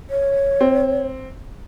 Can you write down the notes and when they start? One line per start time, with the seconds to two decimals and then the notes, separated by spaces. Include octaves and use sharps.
0.10 C#5
0.61 C4